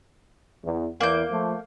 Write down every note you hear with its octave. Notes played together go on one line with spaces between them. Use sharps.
E2
E2 A#3 G6
F3 A3